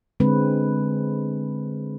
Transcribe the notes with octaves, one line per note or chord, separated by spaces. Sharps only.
D3 G#3 C4 B4